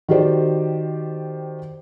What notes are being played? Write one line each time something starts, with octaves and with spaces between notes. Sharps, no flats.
D#3 F#4 G4 C5 D5